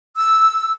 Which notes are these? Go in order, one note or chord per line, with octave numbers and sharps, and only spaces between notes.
E6